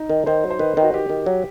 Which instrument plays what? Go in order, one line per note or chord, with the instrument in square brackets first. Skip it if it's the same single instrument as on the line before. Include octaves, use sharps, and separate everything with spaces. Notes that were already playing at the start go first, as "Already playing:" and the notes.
Already playing: [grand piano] D#4
[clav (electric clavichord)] D#3
[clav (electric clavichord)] D#3 [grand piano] C5
[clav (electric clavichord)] F#3
[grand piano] C5
[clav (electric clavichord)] D#3 [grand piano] B4
[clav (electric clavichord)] D#3
[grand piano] F#4
[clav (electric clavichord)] D#3 [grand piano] G4
[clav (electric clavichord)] D#3
F#3